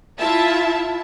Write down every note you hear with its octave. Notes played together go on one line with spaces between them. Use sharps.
E4 F4 E5 A5